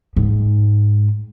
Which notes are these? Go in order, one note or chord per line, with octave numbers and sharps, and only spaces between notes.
G#2